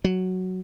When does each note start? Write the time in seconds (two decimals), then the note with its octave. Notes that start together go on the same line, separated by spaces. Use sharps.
0.04 F#3